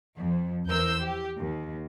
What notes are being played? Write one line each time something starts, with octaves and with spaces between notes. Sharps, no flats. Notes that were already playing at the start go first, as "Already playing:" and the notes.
F2
E2 E3 A#4 C5 E6 G6
G4
D#2